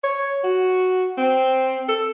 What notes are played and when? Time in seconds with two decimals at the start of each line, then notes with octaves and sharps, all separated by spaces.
0.04 C#5
0.44 F#4
1.18 C4
1.88 A4